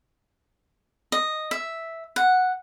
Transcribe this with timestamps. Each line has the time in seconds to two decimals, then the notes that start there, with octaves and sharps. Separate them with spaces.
1.12 D#5
1.51 E5
2.16 F#5